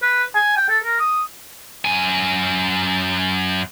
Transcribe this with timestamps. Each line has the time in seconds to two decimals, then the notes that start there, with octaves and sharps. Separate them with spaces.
0.02 B4
0.35 G#5
0.57 G5
0.69 A4
0.84 A#4
1.00 D#6
1.85 F#2 G#5